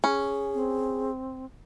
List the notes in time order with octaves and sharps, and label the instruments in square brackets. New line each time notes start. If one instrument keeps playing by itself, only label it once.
[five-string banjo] C#4 [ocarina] G#4
[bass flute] C4